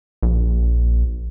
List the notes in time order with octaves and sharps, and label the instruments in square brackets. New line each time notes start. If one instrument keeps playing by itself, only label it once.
[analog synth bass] A#1